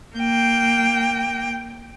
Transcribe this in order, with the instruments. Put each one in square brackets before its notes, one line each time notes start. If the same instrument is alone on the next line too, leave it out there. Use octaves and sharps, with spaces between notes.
[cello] A#3 G5